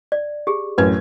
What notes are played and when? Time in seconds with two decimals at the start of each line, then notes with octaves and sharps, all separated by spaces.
0.12 D5
0.47 G4 G#4
0.78 A1 F#2 B4 G#6